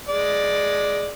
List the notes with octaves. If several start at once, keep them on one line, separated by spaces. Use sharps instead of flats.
G#3 D5